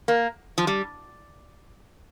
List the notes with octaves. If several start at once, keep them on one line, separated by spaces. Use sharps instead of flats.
A#3
F3
G3